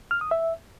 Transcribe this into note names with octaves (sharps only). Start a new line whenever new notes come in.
F6
D#6
E5